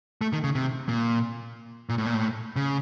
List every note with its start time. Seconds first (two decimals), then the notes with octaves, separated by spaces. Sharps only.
0.21 A3
0.33 D#3
0.44 C#3
0.55 C3
0.88 A#2
1.89 A#2
1.98 A2
2.06 A#2
2.14 A2
2.56 C#3